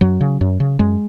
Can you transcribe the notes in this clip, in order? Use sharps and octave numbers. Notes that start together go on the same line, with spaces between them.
F#2 F#3
C#3
F#2
C#3
F#2 G#3